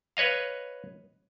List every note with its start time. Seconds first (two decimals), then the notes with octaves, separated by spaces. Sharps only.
0.17 B4 C#5 D#5 F5